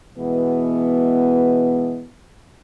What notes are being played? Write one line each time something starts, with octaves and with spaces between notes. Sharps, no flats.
B2 E3 G#3 B3